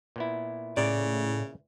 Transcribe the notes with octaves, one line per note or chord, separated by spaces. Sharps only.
A#2 B3 E4
A2 C#3 D5